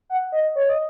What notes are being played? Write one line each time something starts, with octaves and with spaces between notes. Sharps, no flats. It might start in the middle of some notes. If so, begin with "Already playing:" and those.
F#5
D#5
C#5
D#5